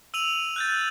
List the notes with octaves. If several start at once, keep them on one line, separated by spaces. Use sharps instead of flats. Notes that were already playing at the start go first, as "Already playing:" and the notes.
E6 D#7 F7 F#7
F#6 G6 A6